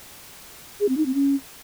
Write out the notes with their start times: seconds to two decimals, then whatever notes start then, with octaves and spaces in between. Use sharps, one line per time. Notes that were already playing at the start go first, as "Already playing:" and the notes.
0.80 G#4
0.89 C4
0.97 D#4
1.06 C4
1.14 C#4